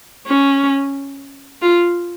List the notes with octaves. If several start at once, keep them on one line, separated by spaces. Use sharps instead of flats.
C#4
F4